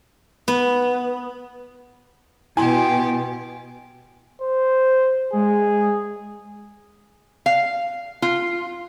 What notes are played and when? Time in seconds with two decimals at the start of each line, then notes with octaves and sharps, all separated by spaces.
0.48 B3
2.57 B2 E4 G4 G#5 C6
4.42 C5
5.33 G#3 G#4
7.46 F5
8.22 F4